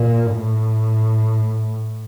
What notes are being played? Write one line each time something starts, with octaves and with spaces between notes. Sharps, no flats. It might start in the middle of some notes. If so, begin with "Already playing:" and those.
Already playing: A#2
A2